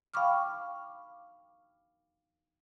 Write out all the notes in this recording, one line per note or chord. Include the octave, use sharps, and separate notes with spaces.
F5 G5 B5 C#6 D6 F6